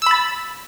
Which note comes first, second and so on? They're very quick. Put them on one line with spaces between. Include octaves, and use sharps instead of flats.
E6 B5 A6